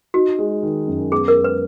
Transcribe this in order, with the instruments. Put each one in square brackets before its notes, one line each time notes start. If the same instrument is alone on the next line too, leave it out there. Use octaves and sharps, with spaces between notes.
[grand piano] D#4 [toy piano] F#4
[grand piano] G#3
D#3
F#2
[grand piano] B3 [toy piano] G#4
[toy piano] A#4
[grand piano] G#3
[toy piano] B4